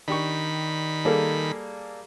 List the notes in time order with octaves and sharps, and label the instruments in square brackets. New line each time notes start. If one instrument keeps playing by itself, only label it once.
[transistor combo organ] D#3 B5 [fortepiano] D4 G4 C#6
[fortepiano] G3 A#3 G#4 [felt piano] A4